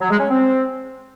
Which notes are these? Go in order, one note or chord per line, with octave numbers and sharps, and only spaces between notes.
F#3
G#3
C#4
C4